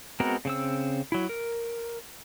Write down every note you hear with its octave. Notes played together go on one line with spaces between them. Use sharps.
G#3 B3 C4 F#4 A#4
C#3 C4 E6
F#3 E4
A#4